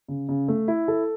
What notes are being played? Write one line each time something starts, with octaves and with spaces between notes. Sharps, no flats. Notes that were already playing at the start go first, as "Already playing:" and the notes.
C#3
C#3
A3
E4
A4